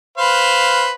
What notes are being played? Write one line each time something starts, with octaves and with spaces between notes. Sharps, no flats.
B4 C5 F5